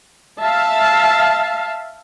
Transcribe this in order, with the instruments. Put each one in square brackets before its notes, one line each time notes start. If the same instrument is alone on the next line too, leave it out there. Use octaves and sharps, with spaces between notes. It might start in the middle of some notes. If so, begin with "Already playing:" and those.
[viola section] E5 F5 A5